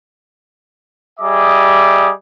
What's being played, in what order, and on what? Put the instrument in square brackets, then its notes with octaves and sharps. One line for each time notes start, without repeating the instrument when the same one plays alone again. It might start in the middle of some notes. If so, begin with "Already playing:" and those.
[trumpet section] G3 G#4 D#5 E5 D6